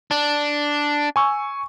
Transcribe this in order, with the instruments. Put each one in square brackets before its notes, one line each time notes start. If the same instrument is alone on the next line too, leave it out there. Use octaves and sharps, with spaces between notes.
[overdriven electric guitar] D4
[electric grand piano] G#5 C#6 E6